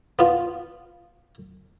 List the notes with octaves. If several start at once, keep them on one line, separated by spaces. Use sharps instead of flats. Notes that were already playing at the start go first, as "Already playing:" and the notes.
B3 F4